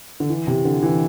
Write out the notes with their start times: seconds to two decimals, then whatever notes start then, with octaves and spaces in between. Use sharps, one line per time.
0.20 D3
0.29 E3
0.47 C3
0.65 D3
0.83 E3